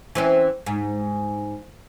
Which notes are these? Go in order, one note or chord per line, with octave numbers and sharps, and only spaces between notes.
E3 C4 C#4
G#2